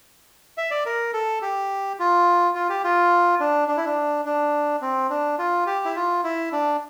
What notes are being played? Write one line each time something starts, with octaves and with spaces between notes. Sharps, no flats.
E5
D5
A#4
A4
G4
F4
F4
G4
F4
D4
D4
E4
D4
D4
C4
D4
F4
G4
E4
F4
E4
D4